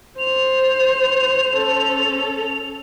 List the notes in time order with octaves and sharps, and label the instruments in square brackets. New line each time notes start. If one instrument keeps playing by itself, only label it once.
[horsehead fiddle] C5 [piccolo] F7
[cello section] C#4 A4